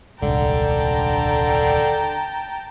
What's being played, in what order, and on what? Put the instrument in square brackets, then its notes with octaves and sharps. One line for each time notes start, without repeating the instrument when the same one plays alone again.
[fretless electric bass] D#1 C2 G#2 [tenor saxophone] D3 [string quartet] G5 A5 A#5